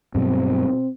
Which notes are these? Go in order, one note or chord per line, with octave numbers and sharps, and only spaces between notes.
G2 B2 F#3 C4